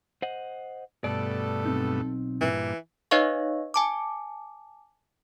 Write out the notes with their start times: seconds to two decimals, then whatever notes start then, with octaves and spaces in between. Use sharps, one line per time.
0.22 C5 D#5 F#5
1.04 G2 B2 A3 A4 D5
1.66 B1 C4 D#4
2.41 G2 A#2 E3
3.11 D#4 B4 C#5 D#5 F5 C#6
3.74 G#5 A5 D6